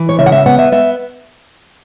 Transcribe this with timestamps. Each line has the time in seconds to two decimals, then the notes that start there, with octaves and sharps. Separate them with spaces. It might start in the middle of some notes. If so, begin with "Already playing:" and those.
Already playing: E3
0.09 C#5
0.19 C#3 E5
0.26 F#5
0.32 E5
0.46 B3 F#5
0.59 E5
0.72 B3 E5